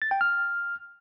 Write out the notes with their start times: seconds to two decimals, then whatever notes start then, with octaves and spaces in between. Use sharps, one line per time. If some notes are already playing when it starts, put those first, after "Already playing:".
0.02 A6
0.11 G5
0.21 F6